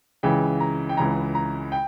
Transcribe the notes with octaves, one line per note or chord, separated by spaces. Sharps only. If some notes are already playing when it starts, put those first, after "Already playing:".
C#2 C#3 E3 G5
A#5
G5
C#2 C#3 E3 A#5
A#5
G5